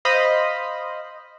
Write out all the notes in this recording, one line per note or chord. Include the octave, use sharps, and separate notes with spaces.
C5 D#5 F5 B5